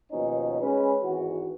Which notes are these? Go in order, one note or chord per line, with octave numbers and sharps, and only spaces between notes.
D#2 B2 F3 C#4 D#4
G#3 C#4 B4
G#1 E3 F#4